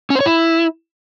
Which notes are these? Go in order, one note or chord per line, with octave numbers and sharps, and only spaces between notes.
C#4
C5
C#5
E4